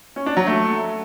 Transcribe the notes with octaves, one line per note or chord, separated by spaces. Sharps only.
C#4
D4
F#3
A3